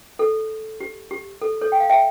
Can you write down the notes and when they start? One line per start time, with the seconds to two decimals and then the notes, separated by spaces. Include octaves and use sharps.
0.19 A4
0.81 G4
1.11 G4
1.42 A4
1.61 A4 C#5
1.72 G5
1.80 F5
1.89 E5 G5